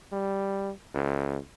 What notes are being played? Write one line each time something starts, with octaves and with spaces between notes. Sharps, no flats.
G3
C#2